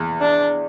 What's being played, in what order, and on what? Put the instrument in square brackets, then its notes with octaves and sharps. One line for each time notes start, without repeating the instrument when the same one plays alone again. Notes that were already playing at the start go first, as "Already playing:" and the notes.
Already playing: [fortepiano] E2
[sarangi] D4